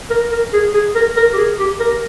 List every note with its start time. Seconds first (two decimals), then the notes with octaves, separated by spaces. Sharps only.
0.10 A#4
0.32 A#4
0.53 G#4
0.74 G#4
0.95 A#4
1.17 A#4
1.33 G4
1.38 G#4
1.59 G4
1.80 A#4